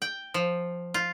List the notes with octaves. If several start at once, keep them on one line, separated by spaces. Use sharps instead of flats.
G5
F3
F4